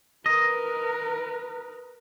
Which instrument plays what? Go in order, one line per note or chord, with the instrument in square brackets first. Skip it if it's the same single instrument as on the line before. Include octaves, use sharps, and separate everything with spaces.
[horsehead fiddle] A#4 B4 [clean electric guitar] D#5